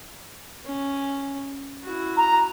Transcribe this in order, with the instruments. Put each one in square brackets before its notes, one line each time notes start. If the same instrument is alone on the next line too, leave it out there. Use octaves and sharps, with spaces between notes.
[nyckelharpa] C#4
E4 F#4
[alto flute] A#5